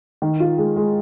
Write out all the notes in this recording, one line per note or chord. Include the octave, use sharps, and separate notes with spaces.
D#3
F4
G#3
G#3